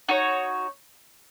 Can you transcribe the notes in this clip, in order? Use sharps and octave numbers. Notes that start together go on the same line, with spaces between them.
D#4 F#4 C#5